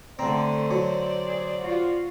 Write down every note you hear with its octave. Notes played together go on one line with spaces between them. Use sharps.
D3 A3 C4 C5 D5 A#5
F#3
G#4
F4 F#4